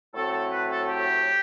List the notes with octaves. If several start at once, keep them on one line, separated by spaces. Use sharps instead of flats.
A2 F#3 A3 C4 A4
A4
B4
A4
G4